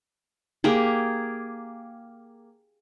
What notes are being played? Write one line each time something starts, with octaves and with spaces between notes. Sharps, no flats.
A#3 G4 G#4